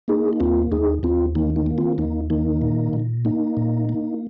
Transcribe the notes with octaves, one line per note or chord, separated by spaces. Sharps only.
A#3 D#4 G#4
D#4
D#2 C4 F4
D#2 D#4 G#4
D#2 C4 F4
D#3 A#3 D#4
A#3 D#4
A#3
C4 F4
D#2 A#3 D#4
D#3 A#3 D#4
A#2
A#2
A#3 D#4
A#2
A#3